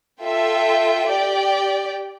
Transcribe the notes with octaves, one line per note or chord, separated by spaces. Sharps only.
F4 A4 E5 G5
G4 D5 G5